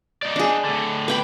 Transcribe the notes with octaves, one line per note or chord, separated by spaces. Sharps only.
D#4 D5
D4 G#4
A2 D3
B4 G5 B5